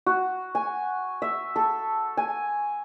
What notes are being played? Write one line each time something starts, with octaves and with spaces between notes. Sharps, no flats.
F#4
G#5
E5
A4
G#5